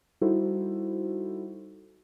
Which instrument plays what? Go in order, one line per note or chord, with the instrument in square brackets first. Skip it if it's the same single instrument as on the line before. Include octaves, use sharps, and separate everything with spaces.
[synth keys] G3 D#4 E4 F#4 A4 C5